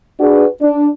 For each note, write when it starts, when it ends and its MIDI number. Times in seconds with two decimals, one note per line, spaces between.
0.21 0.46 62
0.21 0.46 66
0.21 0.46 68
0.21 0.46 71
0.62 0.87 62